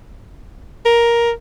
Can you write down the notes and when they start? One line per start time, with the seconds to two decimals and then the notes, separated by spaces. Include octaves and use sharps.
0.86 A#4